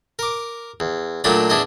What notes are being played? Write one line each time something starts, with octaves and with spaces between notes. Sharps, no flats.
A#4 D6
E2
A#2 F#3 A3 D4 B5 D#6
E2 D4 E4 D#5